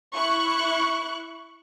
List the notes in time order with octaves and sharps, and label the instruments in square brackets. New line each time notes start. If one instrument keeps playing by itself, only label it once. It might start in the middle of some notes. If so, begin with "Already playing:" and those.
[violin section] E4 C#6 F#6